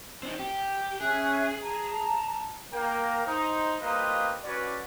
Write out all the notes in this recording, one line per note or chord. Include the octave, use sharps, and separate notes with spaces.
C4 D4 D#4
G4
C#4 G#4 E5 F#6
A5 A#5
A#3 A#4 G5
D#4 C5
G3 A#3 F4 B4 C5 D#5
C#4 F#4 B4 D5